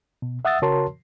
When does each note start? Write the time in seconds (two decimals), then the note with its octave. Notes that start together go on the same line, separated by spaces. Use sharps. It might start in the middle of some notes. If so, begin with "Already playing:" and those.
0.22 B2
0.45 E5 F#5 D#6 E6 A6
0.62 C#3 F#4 A#4 C#5 A5 C6